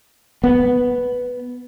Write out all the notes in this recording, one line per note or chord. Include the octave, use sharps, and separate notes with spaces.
B3